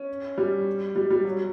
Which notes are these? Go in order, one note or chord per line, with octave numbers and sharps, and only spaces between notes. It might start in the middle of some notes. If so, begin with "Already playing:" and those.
Already playing: C#4
G3
G3
G3
F#3